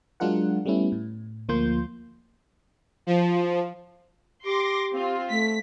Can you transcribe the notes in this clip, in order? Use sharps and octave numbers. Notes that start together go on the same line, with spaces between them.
F#3 G#3 D4 F4 A#4 F#5
G3 A3 B3 C#4 E4
A2
D2 F3 A#3 F4 C6 G6
F3
G4 C6 D6 A#6
C4 F4
A3 B6